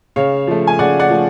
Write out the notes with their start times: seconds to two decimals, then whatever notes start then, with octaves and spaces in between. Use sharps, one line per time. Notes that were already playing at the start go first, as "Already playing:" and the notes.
0.16 C#3 C#5 F5
0.47 F3 A3
0.67 G#5
0.79 C#3 D5 F#5
1.00 D5 F#5
1.10 F3 A3